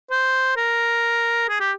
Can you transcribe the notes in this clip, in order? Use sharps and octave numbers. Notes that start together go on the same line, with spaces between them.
C5
A#4
G#4
G4